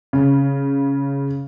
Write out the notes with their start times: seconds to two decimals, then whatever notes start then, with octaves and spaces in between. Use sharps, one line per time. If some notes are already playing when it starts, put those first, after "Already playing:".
0.13 C#3